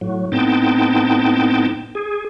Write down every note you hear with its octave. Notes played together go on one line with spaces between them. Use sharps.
A2 F#3
A2 B3 C4 D#4 G5 A5
G#4